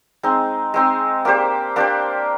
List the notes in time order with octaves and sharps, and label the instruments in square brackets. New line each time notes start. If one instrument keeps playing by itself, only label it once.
[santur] G#3 C4 D#4
G#3 C4 D#4
A#3 D4 G4 C5
A#3 D4 G4 C5